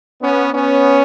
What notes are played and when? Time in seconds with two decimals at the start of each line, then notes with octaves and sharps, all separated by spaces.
0.21 B3 C#4
0.53 B3 C#4